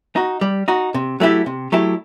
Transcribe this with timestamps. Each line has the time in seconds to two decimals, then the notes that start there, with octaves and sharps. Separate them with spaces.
0.16 D#4 F#4
0.41 G3
0.68 D#4 F#4
0.94 C3
1.20 F#3 A3 E4 G4
1.46 C3
1.72 F#3 A3 E4 G4